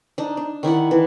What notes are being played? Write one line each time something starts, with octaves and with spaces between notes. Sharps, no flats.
D4 D#4
D4
D#3 E4 D5 F#5
E3